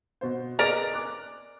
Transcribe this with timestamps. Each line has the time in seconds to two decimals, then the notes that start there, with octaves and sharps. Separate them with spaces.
0.21 B2 C5
0.59 G#4 A#4 B4 D5 D#5 A#5
0.94 D6 F#6